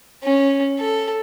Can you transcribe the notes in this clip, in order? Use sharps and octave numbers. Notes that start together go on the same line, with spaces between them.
C#4
A4